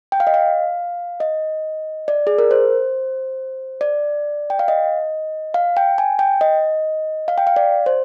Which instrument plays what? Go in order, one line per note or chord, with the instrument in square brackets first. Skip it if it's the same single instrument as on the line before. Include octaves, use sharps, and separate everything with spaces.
[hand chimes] G5
F5
D#5
F5
D#5
D5
G#4
A#4
C5
D5
G5
F5
D#5
F5
G5
G#5
G5
D#5
F5
G5
F5
D5
C5